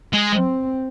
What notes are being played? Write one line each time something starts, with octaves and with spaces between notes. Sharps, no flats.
G#3
C4